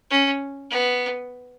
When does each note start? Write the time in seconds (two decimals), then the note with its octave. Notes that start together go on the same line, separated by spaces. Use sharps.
0.11 C#4
0.71 B3